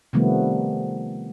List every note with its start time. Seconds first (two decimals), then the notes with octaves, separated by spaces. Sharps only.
0.13 C3 D#3 F3 G3 A3 B3